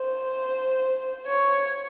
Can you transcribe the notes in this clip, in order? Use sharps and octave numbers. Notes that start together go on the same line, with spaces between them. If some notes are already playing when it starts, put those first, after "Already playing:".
Already playing: C5
C#5